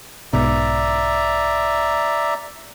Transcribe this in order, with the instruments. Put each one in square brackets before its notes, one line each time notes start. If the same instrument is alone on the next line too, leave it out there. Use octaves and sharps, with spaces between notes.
[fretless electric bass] B1 G#2 B2 [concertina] D5 E5 A#5